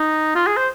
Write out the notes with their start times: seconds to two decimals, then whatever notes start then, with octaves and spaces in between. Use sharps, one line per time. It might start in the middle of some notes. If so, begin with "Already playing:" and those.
Already playing: D#4
0.35 F4
0.47 G#4
0.57 C5